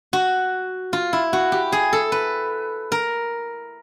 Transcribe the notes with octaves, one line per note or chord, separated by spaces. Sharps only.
F#4
F4
E4
F#4
G4
G#4
A4
B4
A#4